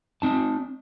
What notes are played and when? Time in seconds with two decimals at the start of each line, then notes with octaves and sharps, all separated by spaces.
0.22 C4 D#4 A5